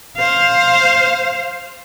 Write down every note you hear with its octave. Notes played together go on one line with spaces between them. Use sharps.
C5 F5